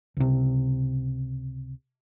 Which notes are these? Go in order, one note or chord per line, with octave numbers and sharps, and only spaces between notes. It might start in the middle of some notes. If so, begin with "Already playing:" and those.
C#2 C3